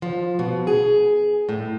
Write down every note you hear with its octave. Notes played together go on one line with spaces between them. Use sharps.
F3
B2
G#4
A2